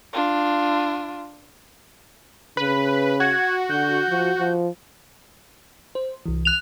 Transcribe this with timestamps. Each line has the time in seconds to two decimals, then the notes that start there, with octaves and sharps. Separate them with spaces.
0.13 D4 F4
2.57 C#3 B4
3.20 F#4 G#6
3.70 D3 G6
4.09 F3
4.38 F3
5.95 C5
6.26 C2 E3
6.45 F#6 F7